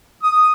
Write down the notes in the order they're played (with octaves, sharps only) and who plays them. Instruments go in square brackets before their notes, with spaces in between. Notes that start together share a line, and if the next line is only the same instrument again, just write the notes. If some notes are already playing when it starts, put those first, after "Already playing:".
[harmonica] D#6